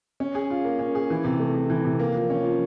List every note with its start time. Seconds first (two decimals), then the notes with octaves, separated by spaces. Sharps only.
0.20 C#4
0.35 G#4
0.50 F4
0.65 A#3
0.79 C#4
0.95 G#4
1.10 E3
1.24 C3
1.40 A3
1.54 C3
1.70 E3
1.85 C3
1.99 A#3
2.15 F3
2.30 C#4
2.44 F3